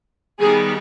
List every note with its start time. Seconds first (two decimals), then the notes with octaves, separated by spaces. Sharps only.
0.40 D#3 G3 B3 D#4 G#4